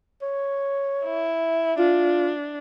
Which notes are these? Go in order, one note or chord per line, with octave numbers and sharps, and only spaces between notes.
C#5
E4
D4 F4